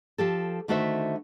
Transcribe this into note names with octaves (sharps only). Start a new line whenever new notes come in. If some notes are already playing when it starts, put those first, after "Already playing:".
F3 G4 A4
D3 D#3 A3 F#4 C5 E5